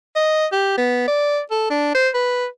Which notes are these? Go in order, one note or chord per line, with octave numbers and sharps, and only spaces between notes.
D#5
G4
B3
D5
A4
D4
C5
B4